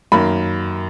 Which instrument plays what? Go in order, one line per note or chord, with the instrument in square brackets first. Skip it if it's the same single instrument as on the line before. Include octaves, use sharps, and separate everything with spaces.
[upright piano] F#2 D#3 A#3 B5